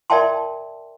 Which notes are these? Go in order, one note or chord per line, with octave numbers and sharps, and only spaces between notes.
A#4 D5 E5 G5 A5 C6